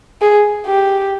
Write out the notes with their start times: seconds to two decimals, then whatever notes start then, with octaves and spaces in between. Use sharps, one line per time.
0.21 G#4
0.66 G4